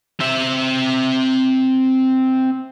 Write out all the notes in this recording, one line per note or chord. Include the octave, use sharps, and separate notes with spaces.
C4 E5